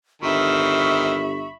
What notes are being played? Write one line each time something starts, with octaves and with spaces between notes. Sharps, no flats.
G1 D#3 C4 E5 B5 C#6